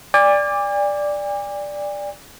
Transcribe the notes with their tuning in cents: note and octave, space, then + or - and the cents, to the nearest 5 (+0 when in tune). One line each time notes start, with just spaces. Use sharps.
D5 +0 G#5 -45